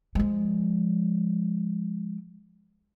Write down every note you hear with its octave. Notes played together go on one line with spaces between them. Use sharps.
F3 G#3